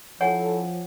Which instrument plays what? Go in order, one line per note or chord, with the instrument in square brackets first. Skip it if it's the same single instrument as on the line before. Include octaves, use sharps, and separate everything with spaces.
[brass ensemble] F3 [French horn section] C#4 E4 A4 [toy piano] C#5 F#5 G#5